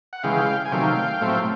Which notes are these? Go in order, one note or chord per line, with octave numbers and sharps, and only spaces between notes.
F#5
C#3 E3 G#3 F5 G5
G#5
C3 D#3 F#3 A3 F5 G5
A2 F#3 A3 C4